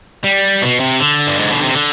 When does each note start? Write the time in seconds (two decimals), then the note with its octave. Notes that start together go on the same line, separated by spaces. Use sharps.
0.24 G3
0.62 B2
0.80 C3
1.00 D3
1.27 G2
1.39 G#2
1.50 B2
1.62 C3
1.74 D3